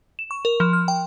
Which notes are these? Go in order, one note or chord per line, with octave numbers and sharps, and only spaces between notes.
E7
C#6
A#4
F3
F6
G5